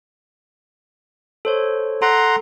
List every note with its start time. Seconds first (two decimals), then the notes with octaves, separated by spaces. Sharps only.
1.45 A4 C5 C#5
2.02 A4 F#5 A#5 C6